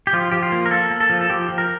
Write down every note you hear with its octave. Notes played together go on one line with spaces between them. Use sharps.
G4
F3 F4
F3 G4
F4
A#3
A#4
A#3 A4
A#3
A4
F3
A4
F3 G4
F3
A#4